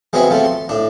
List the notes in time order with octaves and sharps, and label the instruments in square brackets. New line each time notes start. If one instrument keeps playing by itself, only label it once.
[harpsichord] G#3 B3 C4 F#4 C#5 E5
F3 A3 C4
C6
A2 D4